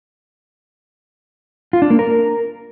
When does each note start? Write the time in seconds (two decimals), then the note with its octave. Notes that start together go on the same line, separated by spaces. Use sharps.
1.73 F4
1.82 D4
1.90 A#3
1.99 A#4